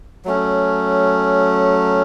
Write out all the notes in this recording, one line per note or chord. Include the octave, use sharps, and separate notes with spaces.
F#3 A3 C#4